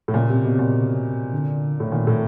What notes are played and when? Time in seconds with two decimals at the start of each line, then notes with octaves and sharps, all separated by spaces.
0.08 A2
0.14 A#2 C#3
0.29 C3
0.44 B2
0.59 A#2
1.32 D3
1.80 A2
1.92 A#2 D#3
2.07 A2